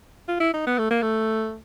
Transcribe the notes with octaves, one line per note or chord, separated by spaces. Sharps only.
F4
E4
D#4
B3
A3
A#3
A3